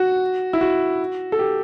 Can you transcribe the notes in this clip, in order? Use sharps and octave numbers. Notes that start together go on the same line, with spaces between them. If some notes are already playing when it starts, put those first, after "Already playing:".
Already playing: F#4
E4
F#4
A4
G4